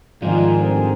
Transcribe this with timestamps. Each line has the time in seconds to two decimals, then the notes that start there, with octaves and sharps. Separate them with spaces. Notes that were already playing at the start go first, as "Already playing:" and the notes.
0.22 G#2 D#3 F3 F4 G#4 A#4 D5
0.58 D3 G3 C4